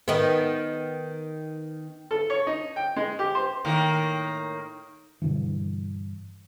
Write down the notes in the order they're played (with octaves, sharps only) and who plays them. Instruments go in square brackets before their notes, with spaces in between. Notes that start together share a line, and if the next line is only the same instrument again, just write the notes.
[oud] D#3 B3
[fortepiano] A4
C#5
D#4
G5
G#3
G4
C5
[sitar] A2 D#3 A#3
[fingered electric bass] G2 B2 D3 E3